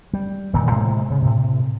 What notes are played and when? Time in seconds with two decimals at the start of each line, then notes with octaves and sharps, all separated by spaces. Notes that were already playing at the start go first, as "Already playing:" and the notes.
0.13 G3
0.53 F1 A#2 D#3 E3
0.71 A2 C3 G#3 A#3
1.10 C#3
1.22 A2 C3